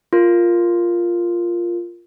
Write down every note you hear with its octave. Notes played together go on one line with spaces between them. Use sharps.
F4 A#4